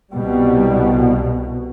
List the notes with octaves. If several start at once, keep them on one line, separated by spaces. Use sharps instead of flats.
C2 B2 G3